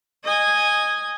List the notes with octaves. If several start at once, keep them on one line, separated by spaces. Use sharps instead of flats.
D#5 G#5